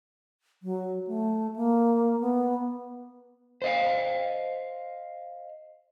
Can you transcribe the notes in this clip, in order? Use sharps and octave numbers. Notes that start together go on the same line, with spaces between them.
F#3
A3
A#3
B3
C5 D#5 F5